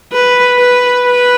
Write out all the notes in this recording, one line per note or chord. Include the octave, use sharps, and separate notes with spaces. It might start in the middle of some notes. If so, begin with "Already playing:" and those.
B4
B4
B4